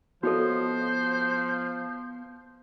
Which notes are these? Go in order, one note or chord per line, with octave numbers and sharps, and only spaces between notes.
F3 B3 F#4 A4 C5 C#5 D#5